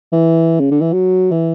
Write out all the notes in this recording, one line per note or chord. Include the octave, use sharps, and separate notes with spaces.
E3
C#3
D3
E3
F#3
E3